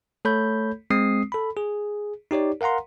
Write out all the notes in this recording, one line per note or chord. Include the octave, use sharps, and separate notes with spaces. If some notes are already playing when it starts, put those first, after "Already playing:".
A3 A4 C#5 B5 G6
G#3 C4 D#6 C7
A4 B5
G#4
D#4 G4 C#5 D5
A#4 F5 F#5 A#5 C6